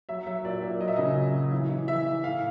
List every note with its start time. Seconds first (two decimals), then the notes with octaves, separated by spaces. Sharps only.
0.09 F#3 E5
0.27 F#3 E5
0.44 A#2 D5
0.62 A#2
0.80 F#3 D#5
0.88 E5
0.96 C#3 D#5
1.15 F#3
1.34 F#3
1.52 E3
1.69 E3
1.88 E3 E5
2.06 E3
2.24 A2 F5